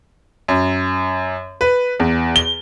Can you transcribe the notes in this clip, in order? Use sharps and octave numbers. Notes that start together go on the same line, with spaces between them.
F#2
B4
E2
G7